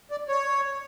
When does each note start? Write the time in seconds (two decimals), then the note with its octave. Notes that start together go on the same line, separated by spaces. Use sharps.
0.11 D5
0.29 C#5